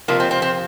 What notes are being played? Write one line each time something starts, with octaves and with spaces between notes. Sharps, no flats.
F2 C3 F3 A#3
C4
C4
C4